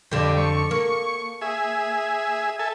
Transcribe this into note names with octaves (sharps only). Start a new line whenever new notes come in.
F2 D3 G3
C#6
A#3
G#4 E5
A4 E5 G#5